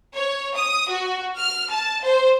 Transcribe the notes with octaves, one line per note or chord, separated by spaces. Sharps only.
C#5
D#6
F#4
F6
A5
C5